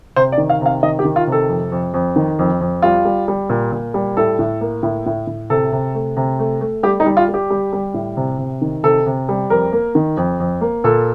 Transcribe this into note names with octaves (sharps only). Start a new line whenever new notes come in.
C3 C5
D5
D#3
F5
C3 F5
D#3 D#5
G4
D#3
F4
C3
A4
F2
F2
F2
D#3
F2
F2
G3 F4
G3
G3
A#2
A#2
G3
A2 A4
A2
A#3
A2
A2
A2
C3 A4
C3
A3
C3
A3
A3
G3 G4
D#4
G3
F4
G3
G4
G3
G3
A2
C3
C3
D#3
C3 A4
C3
G3
F2 A#4
A#3
D#3
F2
F2
A#3
A#2 A4